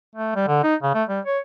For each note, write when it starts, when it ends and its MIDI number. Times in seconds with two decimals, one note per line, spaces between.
0.16 0.34 57
0.35 0.46 55
0.48 0.60 50
0.64 0.75 63
0.83 0.94 49
0.95 1.04 57
1.09 1.20 55
1.26 1.39 73